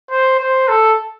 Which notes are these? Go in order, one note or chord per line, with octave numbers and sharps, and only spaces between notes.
C5
C5
A4